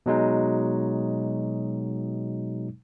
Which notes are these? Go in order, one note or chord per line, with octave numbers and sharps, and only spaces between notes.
B2 F#3 G#3 D#4